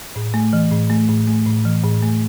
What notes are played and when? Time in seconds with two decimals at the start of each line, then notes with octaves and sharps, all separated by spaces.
0.16 A2
0.34 A3
0.53 E3
0.71 A2
0.90 A3
1.08 A2
1.27 A3
1.46 A2
1.65 E3
1.84 A2
2.03 A3